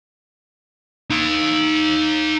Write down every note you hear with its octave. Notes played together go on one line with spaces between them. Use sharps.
D#4 F5